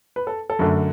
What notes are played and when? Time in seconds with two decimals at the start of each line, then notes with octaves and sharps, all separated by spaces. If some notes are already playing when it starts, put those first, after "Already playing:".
0.16 B4
0.27 A4
0.50 A4
0.59 F#2 D3 A3